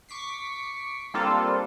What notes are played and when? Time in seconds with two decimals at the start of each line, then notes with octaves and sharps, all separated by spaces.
0.09 C#6 D6 B6 C7
1.14 G3 A#3 C4 D4 F4 A4